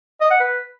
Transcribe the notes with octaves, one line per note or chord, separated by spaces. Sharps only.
D#5
F#5
B4